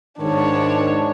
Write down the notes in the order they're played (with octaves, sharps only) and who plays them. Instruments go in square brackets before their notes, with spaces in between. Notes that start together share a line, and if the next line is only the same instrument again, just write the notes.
[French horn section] G#2 D#3 [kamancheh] D4 C#5